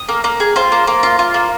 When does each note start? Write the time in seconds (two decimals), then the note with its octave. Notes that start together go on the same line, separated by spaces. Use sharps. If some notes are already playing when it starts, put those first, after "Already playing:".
Already playing: D#6
0.09 A#3
0.24 A#3
0.40 G#4
0.56 F4 C5
0.72 A#3
0.87 A#3
1.03 F4
1.19 F4
1.34 A#3